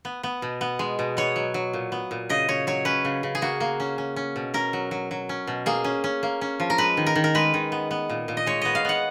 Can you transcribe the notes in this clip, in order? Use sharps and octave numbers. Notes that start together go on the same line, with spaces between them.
B3
B3
B2
B3
G#3
B2
B3 C#5
F#3
F#3
A#2
B3
A#2
C#3 D#5
C#3 C#5
F#3 C#5
C#4 B4
C#3
C#3
G#4
A#3 F#4
A#3
C#4
C#4
C#4
B2
C#4 A#4
F#3
F#3
F#3
C#4
B2
A#3 G#4
C#4
C#4
A#3
C#4
F3
A#4
G#3 B4
D#3
A#4
D#3
A#4
G#3 B4
D#3
B3
B3
A#2
A#2
D#5
G#3 C#5
B3 D#5
F5
B3 F#5